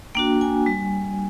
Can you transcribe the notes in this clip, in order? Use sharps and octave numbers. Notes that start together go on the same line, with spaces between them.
A#3 D4 F#4 G5
G#5
G3